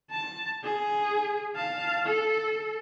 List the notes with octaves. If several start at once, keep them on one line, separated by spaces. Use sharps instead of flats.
A5
G#4
F5 A5
A4